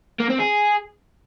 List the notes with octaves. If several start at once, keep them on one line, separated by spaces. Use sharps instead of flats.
A#3
C4
G#4